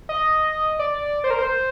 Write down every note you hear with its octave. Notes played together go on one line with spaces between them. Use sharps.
D#5
D5
C5
A#4
C5